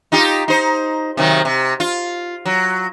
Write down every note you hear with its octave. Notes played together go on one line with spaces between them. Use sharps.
D#4 F4 G4
D#4 C5
C3 D#3 F#3
C3
F4
F#3